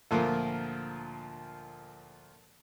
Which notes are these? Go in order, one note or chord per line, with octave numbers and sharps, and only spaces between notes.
D2 A#2 F3 A#3 F4 A#4